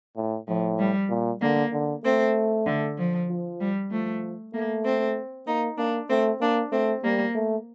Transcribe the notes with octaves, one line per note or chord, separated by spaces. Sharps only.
A2
A2 F3
G3
A#2
D3 A#3
D3
A3 C4
D3
F3
F3
G3
F3 A3
A3 A#3
C4
A#3 D#4
A#3 D4
A3 C4
A#3 D4
A3 C4
G3 A#3
A3